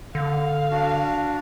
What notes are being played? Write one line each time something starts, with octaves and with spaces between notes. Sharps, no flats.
D3 F5
D4 F#4